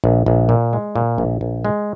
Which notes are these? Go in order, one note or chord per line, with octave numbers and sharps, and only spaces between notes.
A#1
A#1
A#2
G#3
A#2
A#1
A#1
G#3